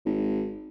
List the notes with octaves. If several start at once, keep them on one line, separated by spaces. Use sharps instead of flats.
G#1